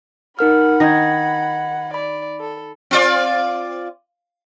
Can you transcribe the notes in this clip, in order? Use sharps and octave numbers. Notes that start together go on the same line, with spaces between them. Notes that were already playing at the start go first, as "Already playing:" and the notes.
D#4 A#4 F#5 B5 F6
D#3 D#4 D#5 G#6 A#6
D5 B5
A4
C4 F4 D5